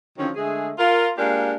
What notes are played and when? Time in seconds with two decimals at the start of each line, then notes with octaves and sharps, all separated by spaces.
0.18 D3 D#3 F3 F#3 C4 C#4
0.35 D3 G#3 A3 G#4
0.78 F4 A#4
1.18 G#3 A#3 D4 F4 G4 A#4